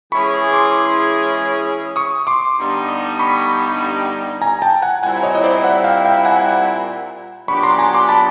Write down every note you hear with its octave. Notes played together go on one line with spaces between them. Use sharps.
E3 G#3 C#4 E4 G#4 B5 C#6
C6 D6
C#6 D#6
C6 D6
G2 D3 G3 B3 D#4
B5 C#6
G#5 A#5
G5 A5
F#5 G#5
A#2 G3 C4 E4 F#5 G#5
C#5 D#5
D#5
C5 D5
E5 F#5
F5 G5
F5 G5
F#5 G#5
A#2 F#3 B3 D4 G4 B5 C#6
A#5 C6
G#5 A#5
C6 D6
A5 B5